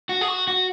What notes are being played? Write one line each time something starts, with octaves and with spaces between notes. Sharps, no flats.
F#4
G#4
F#4
F#4